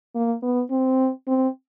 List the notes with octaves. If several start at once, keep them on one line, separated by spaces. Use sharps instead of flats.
A#3
B3
C4
C4